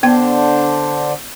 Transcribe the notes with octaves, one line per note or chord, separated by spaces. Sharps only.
D3 B3 D4 C5 G5